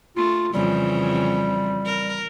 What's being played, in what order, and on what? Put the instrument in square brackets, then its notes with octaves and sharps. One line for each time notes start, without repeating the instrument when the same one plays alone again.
[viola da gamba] A3 [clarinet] F4
[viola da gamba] F2 C#3 E3 [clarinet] G3
[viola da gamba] A#4